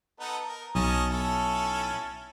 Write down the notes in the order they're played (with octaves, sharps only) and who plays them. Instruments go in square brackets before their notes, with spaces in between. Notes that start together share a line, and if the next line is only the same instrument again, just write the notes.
[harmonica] B3 D#4 A4
A#4
[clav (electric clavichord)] B1 [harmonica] C#4 D#5 A5
[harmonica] C#4 E4 A4